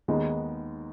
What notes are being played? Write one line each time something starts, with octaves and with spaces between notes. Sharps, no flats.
D#2 D#3 G#3 B3 D#4